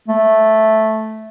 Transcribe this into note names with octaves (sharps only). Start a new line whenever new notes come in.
A3